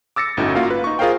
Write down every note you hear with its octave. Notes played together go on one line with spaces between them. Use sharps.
D6 E6 A6 A#6 C#7
G1 A2 C#4 D#4 F#4
A#3 F4 F#4 A#4 F5
B4
D#4 C#6
F4 G#4 A#4 C5 F5 G5